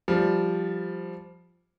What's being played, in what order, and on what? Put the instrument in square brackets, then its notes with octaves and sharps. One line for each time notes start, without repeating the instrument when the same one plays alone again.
[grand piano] F3 G3